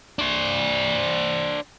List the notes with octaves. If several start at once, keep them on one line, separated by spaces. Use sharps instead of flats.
D4 C5